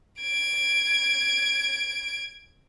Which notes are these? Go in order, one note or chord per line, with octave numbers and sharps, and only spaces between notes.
G#6 D7